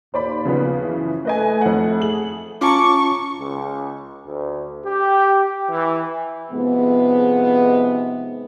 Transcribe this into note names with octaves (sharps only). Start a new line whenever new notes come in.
D#2 A#2 C5 D5 B5
C#3 F3 B3
F#2 E3
A3 B4 D#5 G#5
F2 F#5
G#4 F#7
C#4 F4 A5 A#5 C#6 D6 C#7
C#2
D2
G4
E3
G#2 C3 F3 G#3 B3